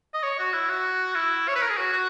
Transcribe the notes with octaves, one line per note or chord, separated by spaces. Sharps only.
D#5
C#5
F#4
E4
F#4
E4
C#5
B4
A#4
G#4
F#4
F#4